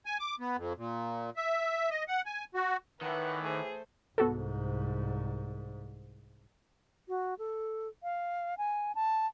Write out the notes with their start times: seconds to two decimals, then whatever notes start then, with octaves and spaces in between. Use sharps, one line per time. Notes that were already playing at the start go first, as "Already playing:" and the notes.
0.06 G#5
0.20 D6
0.40 B3
0.57 F2
0.77 A#2
1.37 E5
1.90 D#5
2.08 F#5
2.26 G#5
2.55 F#4
3.01 A2 D#3 E3 B4 F#5
3.44 A3 G#4 C5
4.18 C2 G#2 B3 F#4 A4
7.08 F#4
7.39 A4
8.03 F5
8.58 G#5
8.95 A5